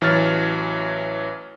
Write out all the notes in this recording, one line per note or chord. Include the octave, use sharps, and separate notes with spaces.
A1 E3 F#3 C#5 F6 A6